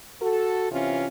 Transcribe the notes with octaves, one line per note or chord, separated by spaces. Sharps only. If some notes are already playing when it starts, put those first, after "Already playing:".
F#4 A4
C3 E3 C#4 F4